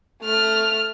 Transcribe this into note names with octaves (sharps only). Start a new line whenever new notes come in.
A3 F6